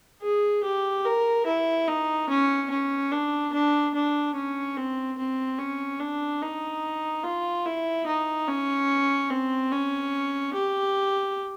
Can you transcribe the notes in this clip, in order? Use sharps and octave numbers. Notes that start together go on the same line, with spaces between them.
G#4
G4
A#4
E4
D#4
C#4
C#4
D4
D4
D4
C#4
C4
C4
C#4
D4
D#4
F4
E4
D#4
C#4
C4
C#4
G4